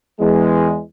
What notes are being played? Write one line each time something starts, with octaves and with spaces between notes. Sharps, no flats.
E2 G#3